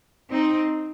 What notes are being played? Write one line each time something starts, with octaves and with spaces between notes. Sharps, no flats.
C4 D#4